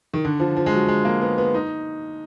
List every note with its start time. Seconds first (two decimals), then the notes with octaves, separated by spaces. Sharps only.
0.14 D#3
0.25 D3
0.40 F3
0.57 F3
0.66 G#3
0.72 F#3
0.88 G#3
1.05 A#3
1.21 B3
1.38 B3
1.54 D#4